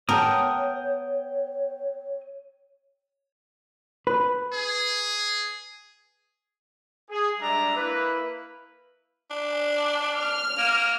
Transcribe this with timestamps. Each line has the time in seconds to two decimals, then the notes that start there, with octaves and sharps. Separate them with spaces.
0.09 B3 A#4 C#5 G5 A5 D#6
4.07 B4
4.54 G#4
7.10 G#4
7.40 G3 G#3 D4 E5 A#5
7.76 A#3 E4 B4
9.30 D4
10.18 F6
10.58 A#3